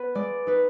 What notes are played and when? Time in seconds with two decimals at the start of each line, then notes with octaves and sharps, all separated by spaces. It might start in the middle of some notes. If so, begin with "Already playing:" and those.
Already playing: B3 B4
0.15 G#3 D5
0.47 D#4 B4